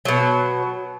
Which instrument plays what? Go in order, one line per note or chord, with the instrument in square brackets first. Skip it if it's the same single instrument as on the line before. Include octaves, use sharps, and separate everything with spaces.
[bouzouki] B2 F#3